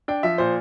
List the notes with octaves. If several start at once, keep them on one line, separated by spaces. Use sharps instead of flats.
D4 G5
F3 E5
A#2 C5